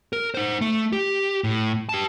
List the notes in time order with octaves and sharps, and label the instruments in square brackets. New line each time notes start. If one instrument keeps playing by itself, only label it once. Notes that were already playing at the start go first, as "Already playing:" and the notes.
[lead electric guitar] A#4
D#4 C5
A3
G4
A2
G4 A5